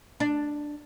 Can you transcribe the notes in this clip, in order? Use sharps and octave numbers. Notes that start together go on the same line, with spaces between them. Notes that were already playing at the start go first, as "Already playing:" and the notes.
D4